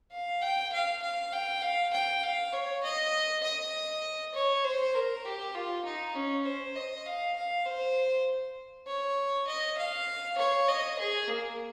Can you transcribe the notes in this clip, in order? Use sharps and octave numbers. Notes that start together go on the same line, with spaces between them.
F5
G5
F5
F5
G5
F5
G5
F5
C#5
D#5
D#5
C#5
C5
A#4
G4
F4
D#4
C#4
C5
D#5
F5
F5
C5
C#5
D#5
F5
C#5
D#5
G#4
A#3